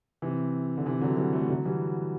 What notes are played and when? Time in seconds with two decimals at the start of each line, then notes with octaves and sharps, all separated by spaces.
0.22 C3 E3
0.78 D3
0.86 C3 E3
1.01 D3 F#3
1.17 E3 G3
1.33 F#3 A3
1.50 D3 F#3
1.65 E3 G3